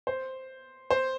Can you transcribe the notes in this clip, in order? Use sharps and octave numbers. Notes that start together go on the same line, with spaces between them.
C5
C5